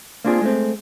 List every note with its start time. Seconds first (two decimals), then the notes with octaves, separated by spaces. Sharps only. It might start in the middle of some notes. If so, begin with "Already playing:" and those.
0.24 A#3 C4 D4 F4 G#4
0.42 G#3 A3 C4